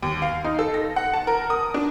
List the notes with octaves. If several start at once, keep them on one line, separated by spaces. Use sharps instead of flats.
D#2
F5
D#4
A4
A#6
F#5
A5
A#4
D#6
D4